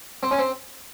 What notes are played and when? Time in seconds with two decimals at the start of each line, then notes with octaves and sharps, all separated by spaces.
0.23 C4
0.31 C#4
0.39 C4